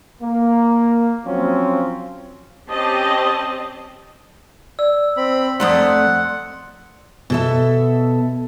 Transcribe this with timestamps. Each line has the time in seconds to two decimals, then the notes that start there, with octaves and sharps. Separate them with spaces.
0.22 A#3
1.25 F3 F#3 C4 C#4 F4
2.69 C4 C#4 G4 D#5 A5
4.79 D5 E6
5.17 C4 B5
5.60 F2 A3 D5 F#5 A#5 C6 D#6
7.30 B2 A4 E5